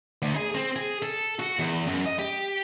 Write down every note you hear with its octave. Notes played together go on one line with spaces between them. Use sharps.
D2
G#4
C4
G#4
A4
F#4
E2
F#2
D#5
G4